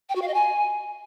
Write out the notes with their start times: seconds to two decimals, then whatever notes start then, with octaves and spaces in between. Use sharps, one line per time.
0.09 G5
0.15 F#4
0.22 F5
0.28 D#5
0.34 G#5